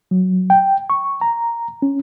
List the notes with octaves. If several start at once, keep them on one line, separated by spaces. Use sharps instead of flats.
F#3
G5
C#6
A#5
C#4